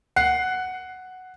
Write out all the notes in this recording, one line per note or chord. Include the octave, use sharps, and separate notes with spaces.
F#5 F#6 C7